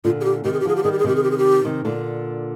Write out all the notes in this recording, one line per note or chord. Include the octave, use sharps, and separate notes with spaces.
A#2 D3 F4
G#4
G4
C3 D#3 G4
G#4
G4
D3 F3 G#4
G4
D#3 G3 G#4
G4
G#4
C3 D#3 G4
G#4
G4
G#4
G4
C3 D#3
A#2 D3